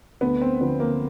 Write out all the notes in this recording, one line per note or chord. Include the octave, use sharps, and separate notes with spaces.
D2 B3
C4
D3 F3 B3
A#3